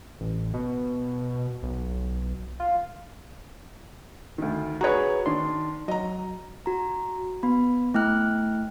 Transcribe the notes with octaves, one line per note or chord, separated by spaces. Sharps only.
A1
B2
B1
F4
D2 D#3
F#4 G#4 B4 C#5 A#5
D#3 D4 C6
F#3 D#5 A#5
F#4 A#5
B3 B5
A3 E4 G5 F6 F#6